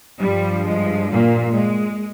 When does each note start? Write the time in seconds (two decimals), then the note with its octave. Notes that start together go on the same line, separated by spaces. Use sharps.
0.22 G2 F3 G3
0.67 G#3
1.11 A#2 A#3
1.57 G#3